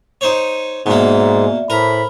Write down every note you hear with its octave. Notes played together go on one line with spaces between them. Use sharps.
D#4 C5 C#5
G#2 B2 A#3 B3 D5 E5
A2 A#4 C5 B5